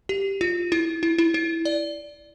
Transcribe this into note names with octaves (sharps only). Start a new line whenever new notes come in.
G4
F4
E4
E4
E4
E4
D5